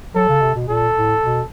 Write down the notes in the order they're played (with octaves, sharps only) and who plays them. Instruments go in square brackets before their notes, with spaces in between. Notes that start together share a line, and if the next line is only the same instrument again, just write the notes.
[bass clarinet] F#3 [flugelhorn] A4
[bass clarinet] C#3
C3
B2
[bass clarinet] A#2 [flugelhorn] A4
[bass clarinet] A2
B2